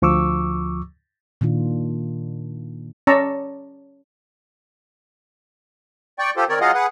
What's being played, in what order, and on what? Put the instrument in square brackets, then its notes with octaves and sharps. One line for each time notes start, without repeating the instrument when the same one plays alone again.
[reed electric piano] D2 F3 C#6 D6 E6
[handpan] A#2 D#3 D4 F4
[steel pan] C#4 D5 A5 A#5 C#6 E6
[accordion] D5 G5 C#6
F4 G4 A4 C5
D#3 C4 A#4 C#5 D5
F#3 F4 G#4 D#5 F5 F#5
G#4 B4 F#5